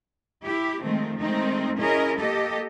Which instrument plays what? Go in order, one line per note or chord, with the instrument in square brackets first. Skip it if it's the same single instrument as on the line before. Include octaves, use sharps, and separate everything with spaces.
[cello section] E4 G4
D#3 F3 G#3 A3 C4
D#3 G#3 A3 C4 D#4
C#4 E4 G#4 A#4 D#5
A#3 G4 A4 D#5